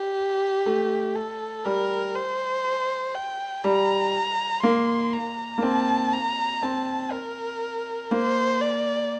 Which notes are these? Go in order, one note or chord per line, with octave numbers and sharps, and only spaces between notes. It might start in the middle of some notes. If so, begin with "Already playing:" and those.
Already playing: G4
A3
A4
G3 A#4
C5
G5
G3 A#5
A#3 C6
A#5
A#3
C4 A5
A#5
C4 A5
A#4
A#3 C5
D5